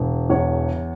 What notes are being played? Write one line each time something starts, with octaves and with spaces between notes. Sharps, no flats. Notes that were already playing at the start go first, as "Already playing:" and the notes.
Already playing: E1
E2 C#5